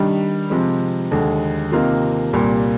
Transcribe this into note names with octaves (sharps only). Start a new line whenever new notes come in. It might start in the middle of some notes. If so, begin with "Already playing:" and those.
Already playing: D#3 G3 D4
C3 F3 G#3
D#2 D3 G#3
C3 D#3 A#3 F4
C2 A#2 G3 A#3